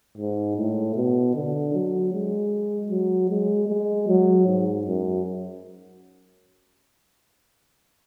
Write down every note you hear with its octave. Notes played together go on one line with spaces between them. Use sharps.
G#2
A2
B2
D3
F#3
G#3
F#3
G#3
G#3
F#3
G#2
F#2